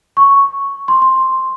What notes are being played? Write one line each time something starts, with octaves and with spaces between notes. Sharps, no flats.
C#6
C6
C6